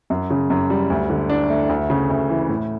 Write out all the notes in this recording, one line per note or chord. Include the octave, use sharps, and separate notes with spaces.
F#2
C#3
F#2
G3
D2
D3
D4
A3
D2
C#3
D2
E3
A2